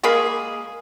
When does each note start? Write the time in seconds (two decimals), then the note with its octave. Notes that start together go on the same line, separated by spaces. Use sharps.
0.03 G#3 A#3 G#4 B5